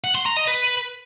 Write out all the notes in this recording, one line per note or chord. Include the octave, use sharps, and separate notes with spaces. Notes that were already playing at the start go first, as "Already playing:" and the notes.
F#5
C6
A#5
D#5
B4